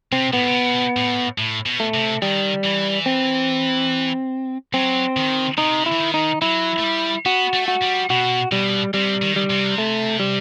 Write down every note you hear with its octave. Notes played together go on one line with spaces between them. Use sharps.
C3 C4
A2 B3
C3
B2
A2
A2
B2
A3
C3
D#3 G3
E3
C4
F#3 C4
D#3
C3 D#4
E4
E3
D#3
D#4
F#3 E4
A3
G3
B3 F#4
A3
F#4
G3
B2 F#4
B2 G3
C3 G3
D#3
G3
C3
A3
G3